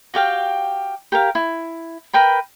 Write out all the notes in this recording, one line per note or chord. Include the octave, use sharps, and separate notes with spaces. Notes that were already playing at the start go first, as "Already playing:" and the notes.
F#4 G4 F5 G5
G4 A#4 F5
E4
A#4 B4 G5 B5